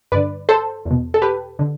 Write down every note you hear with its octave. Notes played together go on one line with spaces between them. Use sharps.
G2 D3 B4 D5
A4 C5
E2
B2
A4
G4 B4
D3